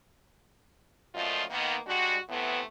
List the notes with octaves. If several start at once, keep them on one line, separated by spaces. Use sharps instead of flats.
F#2 A#2 F3 A3 F4 D#5
D#3 A#3 B3
G3 G#3 D4 F#4
A2 C3 E3 A3 B3